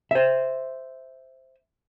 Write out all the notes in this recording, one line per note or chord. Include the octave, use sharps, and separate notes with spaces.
C5 E5